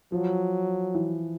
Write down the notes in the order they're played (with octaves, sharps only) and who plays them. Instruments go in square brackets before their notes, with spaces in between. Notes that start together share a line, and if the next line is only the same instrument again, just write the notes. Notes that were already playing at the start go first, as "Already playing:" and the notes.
[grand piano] F3 [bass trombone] F#3
[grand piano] E3